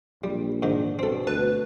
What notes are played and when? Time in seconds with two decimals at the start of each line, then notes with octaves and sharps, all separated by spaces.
0.24 A#1 G3
0.62 G#2 D#3 D4
0.99 B2 C4 A4
1.27 D2 B4 A5